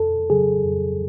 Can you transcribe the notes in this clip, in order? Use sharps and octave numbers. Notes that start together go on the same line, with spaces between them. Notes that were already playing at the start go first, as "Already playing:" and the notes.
Already playing: F2 A4
C#3 F#3 G#4
F2